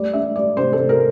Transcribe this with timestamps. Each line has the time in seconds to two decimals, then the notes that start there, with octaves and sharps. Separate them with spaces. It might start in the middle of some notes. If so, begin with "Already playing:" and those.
Already playing: G3 A3 D5
0.13 D4 E5
0.36 G3 D5
0.57 C3 C5
0.73 A4
0.78 C3
0.89 A#4